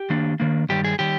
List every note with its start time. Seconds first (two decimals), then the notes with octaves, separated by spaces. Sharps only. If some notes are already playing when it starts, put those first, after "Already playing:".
Already playing: G4
0.10 D#3 A#3 D4
0.40 D#3 A#3 D4
0.69 G2 D#3 G3 G4
0.84 G#4
0.99 D#3 G3 G4